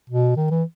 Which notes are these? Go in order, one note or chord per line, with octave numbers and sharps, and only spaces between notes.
B2
D#3
E3